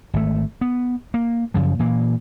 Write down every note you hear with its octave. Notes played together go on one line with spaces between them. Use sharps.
G#1 A3
B3
A#3
F#2 C#3 F3
A#2 E3 A#3